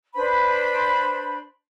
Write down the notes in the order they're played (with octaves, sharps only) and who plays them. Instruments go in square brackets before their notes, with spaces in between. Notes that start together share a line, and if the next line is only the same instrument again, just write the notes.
[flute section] D4 B4 C5 B5